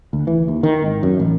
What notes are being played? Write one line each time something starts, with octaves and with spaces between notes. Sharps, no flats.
D2
E3
D#2
D#3
G#1
F#2
A1